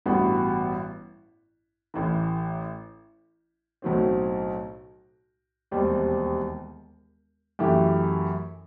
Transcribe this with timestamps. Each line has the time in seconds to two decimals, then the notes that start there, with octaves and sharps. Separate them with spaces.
0.06 A1 G2 E3 B3 F#4
1.94 A1 A2 E3
3.82 B1 A2 F#3 C4
5.71 E1 D#2 D#3 G3 C4
7.59 F#2 E3 A3 E4 G4